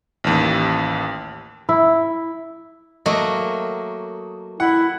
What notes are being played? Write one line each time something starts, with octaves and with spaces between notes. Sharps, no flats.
A1 D#2
E4
F#3 A3 A#3 D#5
E4 F#5